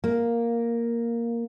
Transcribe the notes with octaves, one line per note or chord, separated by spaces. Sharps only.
A#3